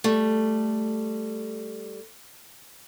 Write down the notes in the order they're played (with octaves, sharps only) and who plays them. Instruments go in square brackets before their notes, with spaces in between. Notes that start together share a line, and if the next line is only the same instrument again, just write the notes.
[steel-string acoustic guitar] G3 A3